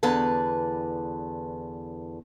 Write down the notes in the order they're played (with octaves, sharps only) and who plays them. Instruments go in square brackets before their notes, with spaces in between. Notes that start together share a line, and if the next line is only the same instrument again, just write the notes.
[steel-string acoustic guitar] E2 D3 B4 A5